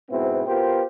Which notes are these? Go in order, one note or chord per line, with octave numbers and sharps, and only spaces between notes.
G#2 B2 B3 C4 E4
B3 F4 G4 A#4 C5